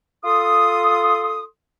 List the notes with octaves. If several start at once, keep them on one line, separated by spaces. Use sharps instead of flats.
F4 A4 C6 D#6